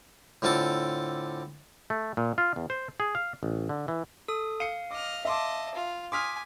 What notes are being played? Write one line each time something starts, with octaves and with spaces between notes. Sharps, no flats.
A2 D3 C4 F4 A4 D6
A3
A#2
F4
E2
C5
G#4
F5
A1
D3
E3
A4 D#6
F5 C#7 D#7
D#5 D6 F6
D#5 E5 A5 C6 D6
F4
G#5 C6 D6 D#6 F6 B6